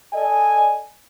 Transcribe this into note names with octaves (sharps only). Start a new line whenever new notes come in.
A4 D5 D#5 G#5